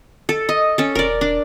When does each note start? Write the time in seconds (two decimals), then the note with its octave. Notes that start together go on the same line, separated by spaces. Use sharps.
0.29 A4
0.49 D#5
0.78 C#4 A4
0.95 E1 A#4 D5
1.21 D4